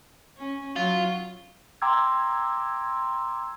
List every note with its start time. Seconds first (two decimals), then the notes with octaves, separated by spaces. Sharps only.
0.37 C#4
0.76 F#3 F4
1.82 G5 A#5 C6 D6 E6 G#6